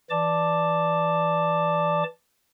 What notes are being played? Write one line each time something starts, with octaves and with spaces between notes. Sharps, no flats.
E3 D5 A5 D6